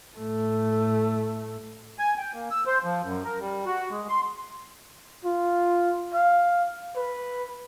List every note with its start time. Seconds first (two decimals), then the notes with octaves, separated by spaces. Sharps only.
0.17 A2 A3
1.99 G#5
2.18 G5
2.34 A#3
2.51 E6
2.67 C5
2.84 F3
3.03 F#2
3.25 A#4
3.40 G3
3.66 F#4
3.91 G#3
4.09 C6
5.25 F4
6.14 F5
6.96 B4